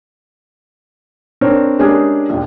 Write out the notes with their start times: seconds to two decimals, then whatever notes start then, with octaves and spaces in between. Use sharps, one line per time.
1.41 C4 D4 A#4 C#5
1.79 G#3 C#4 D4 G4 G#4 A#4
2.29 A#1 D#2